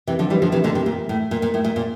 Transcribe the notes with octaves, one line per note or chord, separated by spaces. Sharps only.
C3 E3
D3 F3
E3 G3
D3 F3
C3 E3
A#2 D3
C3
A#2
A2
A#2
A#2
A2
A#2
A#2